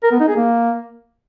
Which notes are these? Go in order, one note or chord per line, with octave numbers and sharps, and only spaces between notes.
A#4
B3
D#4
G#4
A#3